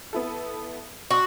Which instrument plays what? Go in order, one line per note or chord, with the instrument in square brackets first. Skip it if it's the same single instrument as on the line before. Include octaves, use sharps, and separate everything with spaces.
[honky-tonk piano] B3 E4 A4
[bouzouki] F#4 [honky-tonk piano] C6 D#6